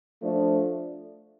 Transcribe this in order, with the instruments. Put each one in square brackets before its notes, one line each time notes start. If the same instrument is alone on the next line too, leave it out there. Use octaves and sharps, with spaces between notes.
[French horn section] F3 A3 D4